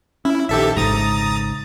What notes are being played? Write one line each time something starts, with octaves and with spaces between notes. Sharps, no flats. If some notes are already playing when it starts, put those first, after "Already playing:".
C#4 E4
A#1 D#3 G4 A4 E5
G#1 G#2 C#3 A#5 D#6 A6